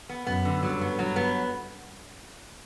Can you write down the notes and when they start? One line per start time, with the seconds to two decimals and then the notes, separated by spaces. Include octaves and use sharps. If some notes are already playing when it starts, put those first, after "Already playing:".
0.09 B3
0.27 F#2 B3
0.45 D3
0.63 G2 F#3
0.81 B3
0.98 G2 F#3
1.16 B3